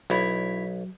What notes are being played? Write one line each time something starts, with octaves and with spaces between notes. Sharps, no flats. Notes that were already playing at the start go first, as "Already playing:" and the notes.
B1 F#3 E4 C#5